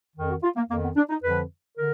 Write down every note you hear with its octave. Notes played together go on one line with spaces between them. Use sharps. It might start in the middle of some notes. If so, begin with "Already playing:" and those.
F2 D#3
F#4
F4
A#3
F2 D#3 A#3
B3
D4
D#4
F2 D3 F3 B4
D3 A#4